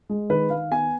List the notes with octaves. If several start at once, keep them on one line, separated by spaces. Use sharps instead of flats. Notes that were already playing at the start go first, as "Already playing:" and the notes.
G#3
D#3 B4
D#3 F5
B3 G#5